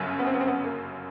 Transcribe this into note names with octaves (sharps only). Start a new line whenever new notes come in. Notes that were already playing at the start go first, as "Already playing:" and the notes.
Already playing: G1 F#2 C#3 F#3
B3
C4
B3
C4
B3
A#3